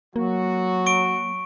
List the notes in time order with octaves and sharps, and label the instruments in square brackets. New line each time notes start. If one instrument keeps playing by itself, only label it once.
[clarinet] F#3 [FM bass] A#3 [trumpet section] F#4
[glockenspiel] C#6 D7